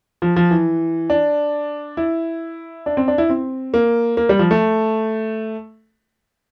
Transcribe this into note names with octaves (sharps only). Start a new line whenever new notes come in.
F3
F3
E3
D4
E4
D4
C4
D4
E4
C4
A#3
A#3
G3
F3
A3